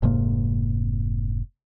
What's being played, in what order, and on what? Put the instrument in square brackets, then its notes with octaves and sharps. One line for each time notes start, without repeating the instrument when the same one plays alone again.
[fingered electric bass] F1 G#2 C3 A#3